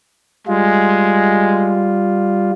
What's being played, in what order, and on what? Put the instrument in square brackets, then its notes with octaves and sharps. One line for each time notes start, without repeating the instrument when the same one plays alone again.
[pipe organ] G3 F4 [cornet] G#3